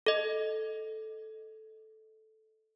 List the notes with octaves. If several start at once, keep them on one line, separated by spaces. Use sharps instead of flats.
A4 D#5